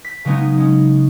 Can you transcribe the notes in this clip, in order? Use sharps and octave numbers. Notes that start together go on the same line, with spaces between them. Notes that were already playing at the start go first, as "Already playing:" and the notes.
B6
C#3 F#3 G#3 B3 C#4 D#4
G#3 C#4